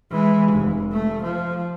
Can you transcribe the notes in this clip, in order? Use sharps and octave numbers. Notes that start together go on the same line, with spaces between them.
E3 G#3
F1
A3
F3